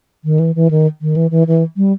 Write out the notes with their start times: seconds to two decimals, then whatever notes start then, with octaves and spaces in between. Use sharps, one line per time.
0.25 D#3
0.39 E3
0.55 E3
0.71 D#3
1.02 D#3
1.16 E3
1.31 E3
1.47 E3
1.77 G3